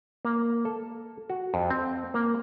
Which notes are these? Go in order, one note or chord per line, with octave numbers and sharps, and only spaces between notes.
A#3
A4
F#4
F2
C4
A#3